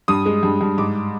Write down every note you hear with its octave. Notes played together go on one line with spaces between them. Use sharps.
G2 D#6
G#3
G2
G2
G#2 D6